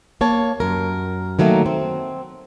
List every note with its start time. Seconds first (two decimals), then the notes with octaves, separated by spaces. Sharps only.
0.21 A#3 C#5 A5
0.60 F#2 A#4
1.39 D#3 F#3 A3 A#3
1.66 C4